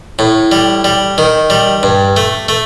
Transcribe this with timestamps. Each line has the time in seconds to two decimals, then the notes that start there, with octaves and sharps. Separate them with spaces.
0.19 A2
0.52 G3
0.84 G3
1.18 D#3
1.50 G3
1.83 G2
2.16 A3
2.49 A3